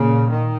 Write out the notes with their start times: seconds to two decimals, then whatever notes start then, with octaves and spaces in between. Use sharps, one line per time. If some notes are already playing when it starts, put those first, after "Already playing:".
Already playing: A#2 C#3
0.29 D#3